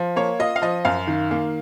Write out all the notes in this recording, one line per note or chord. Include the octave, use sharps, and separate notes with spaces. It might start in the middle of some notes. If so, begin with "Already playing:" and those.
Already playing: F3
A#3 C#5
F4 D#5
F5
F3 D#5
F#2 F5
D#3
A#3